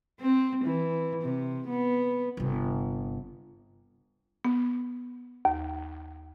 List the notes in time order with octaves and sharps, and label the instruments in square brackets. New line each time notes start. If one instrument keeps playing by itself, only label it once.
[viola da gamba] C4
E3
C3
B3
[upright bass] G1 C3
[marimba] B3
D#2